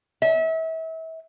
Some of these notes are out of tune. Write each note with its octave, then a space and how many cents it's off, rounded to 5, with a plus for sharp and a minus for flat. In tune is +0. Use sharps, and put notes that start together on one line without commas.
E5 -35